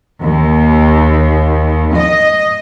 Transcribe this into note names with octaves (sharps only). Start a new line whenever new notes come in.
D#2
D#5